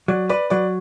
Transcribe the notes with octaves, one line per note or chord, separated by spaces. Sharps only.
F#3 D5
B4 D5
F#3 D5